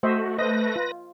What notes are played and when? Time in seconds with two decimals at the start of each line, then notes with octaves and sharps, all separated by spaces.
0.03 A3 F#4 C5 D#5 E5
0.39 B4 C5 D#5 A#6
0.76 F4